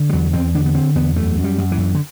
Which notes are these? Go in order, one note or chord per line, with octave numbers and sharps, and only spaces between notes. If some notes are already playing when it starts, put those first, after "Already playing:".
Already playing: D3
G3
E2 F#3
E2 C4
D3 D4
B3
D3 C4
E2 B3
F#2 A3
F#2
G3
F#2
E3
F#2
D3